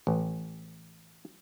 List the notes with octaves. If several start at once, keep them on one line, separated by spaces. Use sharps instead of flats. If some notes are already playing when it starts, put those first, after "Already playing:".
A1